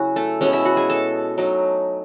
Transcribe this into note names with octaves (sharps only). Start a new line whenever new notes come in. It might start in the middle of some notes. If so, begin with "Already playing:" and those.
Already playing: C#3 F#3 C#4 E4 F#4
A3 A4
B2 G#3 B3 C#4 C#5
E4 E5
F#4 F#5
G#4 G#5
A4 A5
F#3 A3 D#4